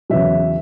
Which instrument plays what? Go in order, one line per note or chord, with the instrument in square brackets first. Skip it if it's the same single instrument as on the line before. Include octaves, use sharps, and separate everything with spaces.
[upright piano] E2 C#3 F#3 E5